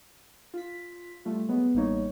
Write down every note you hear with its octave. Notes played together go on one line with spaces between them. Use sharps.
F4 B6
G3 A3 F4
F#3 G#3 B3
A1 G3 A#3 D#4 C#5